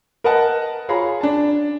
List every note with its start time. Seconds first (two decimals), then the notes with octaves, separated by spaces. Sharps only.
0.24 A#4 B4 D#5 F#5 A5
0.89 F4 G#4 C#5 A#5 B5
1.21 D4 A5